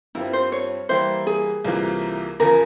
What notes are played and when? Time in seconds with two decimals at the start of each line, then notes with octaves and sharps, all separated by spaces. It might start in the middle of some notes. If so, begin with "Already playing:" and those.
0.15 G2 G3 C4 E4 F4
0.33 C5
0.52 C#5
0.89 E3 G3 A#3 E4 G4 C5
1.27 G#4
1.65 C2 C3 E3 A#3 F4
2.40 E2 C#3 F3 A#4